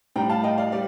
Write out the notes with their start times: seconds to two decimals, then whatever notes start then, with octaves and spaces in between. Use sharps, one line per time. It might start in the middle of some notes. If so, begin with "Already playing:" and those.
0.16 A2 G3 G5 A#5
0.30 F5 A5
0.44 D#5 G5
0.58 D5 F5
0.72 G3 D5